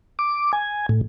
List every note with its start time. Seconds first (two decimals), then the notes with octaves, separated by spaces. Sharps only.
0.19 D6
0.53 G#5
0.89 A2